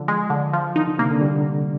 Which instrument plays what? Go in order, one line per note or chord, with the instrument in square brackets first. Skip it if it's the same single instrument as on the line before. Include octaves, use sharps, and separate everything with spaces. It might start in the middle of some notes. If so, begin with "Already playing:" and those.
Already playing: [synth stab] D3 [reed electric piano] F3
[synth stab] G#3
D3
F3
[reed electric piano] D#3 [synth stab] D#4
[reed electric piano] D3
[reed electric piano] C3 [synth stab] A#3
[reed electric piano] D3
G3